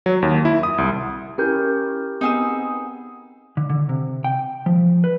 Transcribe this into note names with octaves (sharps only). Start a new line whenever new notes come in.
F#3
D#2
E4
D#6
C2
C#4 E4 G4 A#4 G6
B3 C4 D#4 G#4 E6
D3
D3
C3
G5
F3
B4